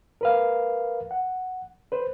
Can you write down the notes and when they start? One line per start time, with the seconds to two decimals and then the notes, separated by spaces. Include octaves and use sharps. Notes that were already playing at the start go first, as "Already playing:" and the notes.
0.21 A#4 B4 F5
1.11 F#5
1.92 B4 C5